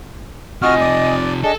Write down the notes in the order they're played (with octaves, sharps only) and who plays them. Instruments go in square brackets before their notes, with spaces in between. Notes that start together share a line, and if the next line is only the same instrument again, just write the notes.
[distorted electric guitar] C3 F3 [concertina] F#4 F6 [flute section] D#5 G#5 D#6
[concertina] D5
[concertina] D4 [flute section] G#4 D#5 [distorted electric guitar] A4